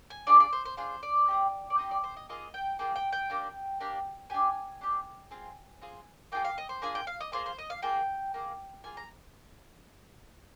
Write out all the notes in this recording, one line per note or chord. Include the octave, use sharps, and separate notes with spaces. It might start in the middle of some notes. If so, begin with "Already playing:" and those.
G#5
D4 F4 G#4 D5
D5
C5
C5
D4 F4 G#4 C5
D5
C4 D#4 G4
D5
C4 D#4 G4 D#5
D5
C5
D#5
A#3 F4 G#4 D#5
G5
A#3 F4 G#4 G5
G5
G5
A#3 D4 G4
A#3 D4 G4
D4 G4 G#5
D4 G4
C4 F4 G#4
C4 F4 G#4
A#3 D4 F4 G#4 G5
F5
D#5
C5
A#3 D4 F4 G#4 G#5
G5
F5
D#5
A#3 F4 G#4 C5
C5
D#5
F5
A#3 F4 G#4 G5
A#3 F4 G#4
A#3 F4 G#4 G#5
A#5